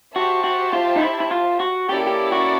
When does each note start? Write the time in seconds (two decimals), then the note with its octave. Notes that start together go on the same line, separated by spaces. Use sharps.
0.15 F#4 G4 C5 E5 A5
0.44 F#4
0.73 F4
0.96 D#4
1.02 E4
1.20 E4
1.31 F4
1.60 F#4
1.89 A#3 C#4 E4 G4 A4 D5
2.07 G4
2.32 F#4